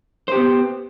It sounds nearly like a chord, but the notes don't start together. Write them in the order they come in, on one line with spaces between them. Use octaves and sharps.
C5 G4 B3